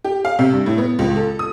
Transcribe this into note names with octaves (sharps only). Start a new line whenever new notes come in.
G4
F5
C3
G2
A2
B3
C#2
A4
D#6